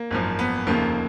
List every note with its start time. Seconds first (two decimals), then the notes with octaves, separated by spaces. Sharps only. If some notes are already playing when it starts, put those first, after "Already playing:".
Already playing: A#3
0.11 G#1 F#2 F3
0.39 B3
0.67 F1 D#2 C#3 F3 A#3